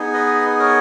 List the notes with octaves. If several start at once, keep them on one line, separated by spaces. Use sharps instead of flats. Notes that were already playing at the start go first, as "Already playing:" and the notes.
Already playing: B3 D#4 G#4
B4 D#5
A#4 C#5